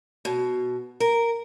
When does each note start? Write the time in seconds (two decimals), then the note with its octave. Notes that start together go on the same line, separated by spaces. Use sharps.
0.25 B2
1.00 A#4